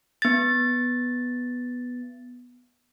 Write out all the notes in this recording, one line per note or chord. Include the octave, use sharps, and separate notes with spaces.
B3 A6